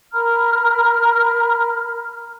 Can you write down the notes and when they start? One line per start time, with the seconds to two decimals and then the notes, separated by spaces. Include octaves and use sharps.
0.13 A#4 A#5 B5 F6